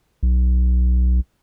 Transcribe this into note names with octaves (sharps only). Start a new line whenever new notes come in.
B1